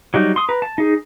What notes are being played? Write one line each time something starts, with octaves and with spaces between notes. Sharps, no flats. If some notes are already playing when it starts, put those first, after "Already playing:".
F#3 G3 D#4
C6 D#6
B4 A#5
A5
D#4 G#4